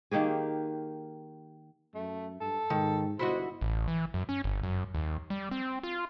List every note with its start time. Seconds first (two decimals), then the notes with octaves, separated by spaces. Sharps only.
0.11 D#3 A#3 G4 G#4
1.95 F#2 A3
2.41 G2 A4
2.70 G#2 D#3
3.19 G1 E4 F#4 C5 D#5
3.61 A1
3.88 E3
4.14 F#2
4.29 C#4
4.44 G1
4.63 F#2
4.95 D#2
5.30 G3
5.51 C4
5.83 F4